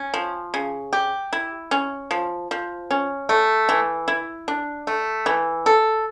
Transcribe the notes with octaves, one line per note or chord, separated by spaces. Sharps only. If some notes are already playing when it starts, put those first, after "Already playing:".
Already playing: C#4
F3
C#3
G4
E4
C#4
F3
F3
C#4
A3
E3
E4
D4
A3
E3
A4